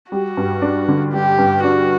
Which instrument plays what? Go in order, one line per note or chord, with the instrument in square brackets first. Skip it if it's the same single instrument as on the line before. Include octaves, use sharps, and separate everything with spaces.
[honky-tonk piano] G3 [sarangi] F#4
[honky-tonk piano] G2
D4
D3
[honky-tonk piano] G3 [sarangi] G4
[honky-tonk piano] G2
[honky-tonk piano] D4 [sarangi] F#4